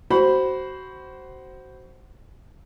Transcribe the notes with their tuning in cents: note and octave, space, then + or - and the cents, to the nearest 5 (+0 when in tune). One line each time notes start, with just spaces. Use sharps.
F#4 +25 C5 +0 B5 +0